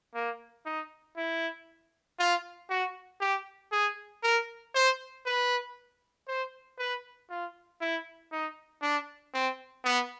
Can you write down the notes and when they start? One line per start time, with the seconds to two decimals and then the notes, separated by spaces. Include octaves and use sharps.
0.15 A#3
0.65 D#4
1.17 E4
2.19 F4
2.70 F#4
3.20 G4
3.72 G#4
4.23 A#4
4.74 C5
5.26 B4
6.28 C5
6.78 B4
7.30 F4
7.81 E4
8.32 D#4
8.82 D4
9.34 C4
9.84 B3